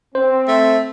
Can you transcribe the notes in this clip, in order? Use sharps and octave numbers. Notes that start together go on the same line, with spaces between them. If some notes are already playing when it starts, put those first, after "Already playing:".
C4 C5
A3